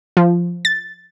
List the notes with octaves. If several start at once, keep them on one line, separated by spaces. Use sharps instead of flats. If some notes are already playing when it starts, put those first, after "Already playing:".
F3
A6